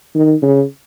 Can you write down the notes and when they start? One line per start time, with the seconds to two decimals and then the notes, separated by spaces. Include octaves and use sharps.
0.14 D#3
0.42 C#3